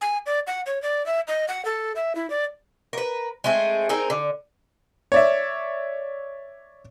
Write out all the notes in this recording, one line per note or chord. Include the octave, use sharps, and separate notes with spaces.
G#5
D5
F#5
C#5
D5
E5
D#5
F#5
A4
E5
E4
D5
A#4 B4
G#3 A3 C4 G#4
C4 D#4 G#4 A#4
D3
C#5 D5 E5